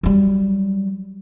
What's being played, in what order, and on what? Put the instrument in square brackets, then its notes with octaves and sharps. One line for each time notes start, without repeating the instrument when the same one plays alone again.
[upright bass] F#3 G3